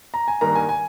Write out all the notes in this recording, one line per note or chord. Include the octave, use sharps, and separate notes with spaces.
A#5
G#5
G2 D#3 A#3 A#5
G#5
G#5